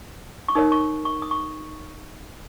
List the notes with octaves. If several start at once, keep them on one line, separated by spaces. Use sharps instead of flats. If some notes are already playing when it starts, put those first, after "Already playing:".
C#6
D#4 A#4 C#5 D#6
C#6
C#6
D#6
C#6